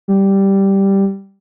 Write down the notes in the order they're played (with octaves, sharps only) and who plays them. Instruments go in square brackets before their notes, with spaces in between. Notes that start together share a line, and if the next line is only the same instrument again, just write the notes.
[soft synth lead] G3